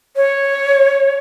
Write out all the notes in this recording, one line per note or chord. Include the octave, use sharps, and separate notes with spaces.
C#5